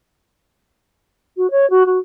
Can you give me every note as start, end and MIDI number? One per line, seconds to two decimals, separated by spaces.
1.37 1.50 66
1.51 1.68 73
1.70 1.83 66
1.86 1.98 66